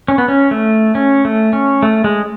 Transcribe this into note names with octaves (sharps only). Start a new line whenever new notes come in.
C#4
B3
C#4
A3
C#4
A3
C#4
A3
G#3